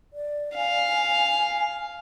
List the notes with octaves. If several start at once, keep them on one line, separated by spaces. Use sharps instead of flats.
D5
F5 G#5